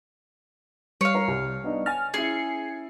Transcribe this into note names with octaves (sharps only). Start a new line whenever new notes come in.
G3 C#5 F5
A#4
C2
B3 D4 D#4
G#5 F6 A6
C#4 E4 G#4 C7 C#7